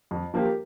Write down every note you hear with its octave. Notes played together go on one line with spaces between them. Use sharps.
F2
F3 A#3 G4 A#4